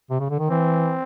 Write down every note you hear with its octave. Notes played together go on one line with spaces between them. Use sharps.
C3
C#3
D3
D#3
E3 C4